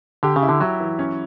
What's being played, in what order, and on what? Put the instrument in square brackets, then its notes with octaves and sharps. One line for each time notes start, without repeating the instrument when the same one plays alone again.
[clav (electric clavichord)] D3 [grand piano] G4
[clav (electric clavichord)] C#3
[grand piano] E4
[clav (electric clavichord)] D3
[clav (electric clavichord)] F#3 [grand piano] E4
[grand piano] E3
C#4